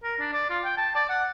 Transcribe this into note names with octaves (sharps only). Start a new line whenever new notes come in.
A#4
D4
D5
F4
G5
A5
D5
F#5